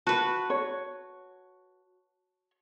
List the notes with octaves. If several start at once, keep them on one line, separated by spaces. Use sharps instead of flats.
F#4 B4 A5 F#6
C#5